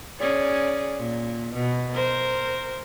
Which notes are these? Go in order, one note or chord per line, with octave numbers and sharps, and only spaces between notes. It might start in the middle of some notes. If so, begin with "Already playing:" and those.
C#4 G#4 D5
A#2
B2
A#4 C5